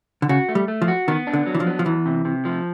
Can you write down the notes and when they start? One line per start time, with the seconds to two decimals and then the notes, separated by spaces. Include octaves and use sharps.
0.22 D3
0.29 C#3 F#4
0.49 A3
0.55 G3
0.68 A3
0.82 F3
0.88 F#4
1.08 D#3 B3
1.27 D4
1.33 D3
1.47 F#3
1.55 E3
1.60 F3
1.67 B3
1.79 F3
1.86 E2 E3
2.06 C3
2.25 C3
2.45 F3